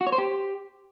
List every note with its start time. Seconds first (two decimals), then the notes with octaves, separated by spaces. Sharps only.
0.01 F#4
0.07 C#5
0.12 C5
0.18 G4